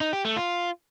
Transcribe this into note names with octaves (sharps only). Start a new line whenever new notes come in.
D#4
G4
A3
F4